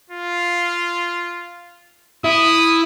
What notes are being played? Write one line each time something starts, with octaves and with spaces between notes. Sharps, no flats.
F4
E4 D#6